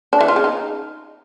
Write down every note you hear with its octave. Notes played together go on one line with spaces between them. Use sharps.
D4
E3
F4
C#3
D#4